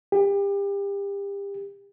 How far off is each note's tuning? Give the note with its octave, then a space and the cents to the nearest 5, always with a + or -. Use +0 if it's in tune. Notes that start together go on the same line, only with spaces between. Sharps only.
G4 +30